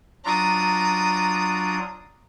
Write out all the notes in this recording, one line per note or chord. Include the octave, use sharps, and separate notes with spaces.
F#3 D4 F4 A#5 D#6